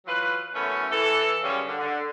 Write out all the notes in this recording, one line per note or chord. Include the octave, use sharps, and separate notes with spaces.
E3 F#3 F4 B4
F#2 E3 A3 B3 C#4
E3 A4
F#2 C#3 G3 C#4
D3
D3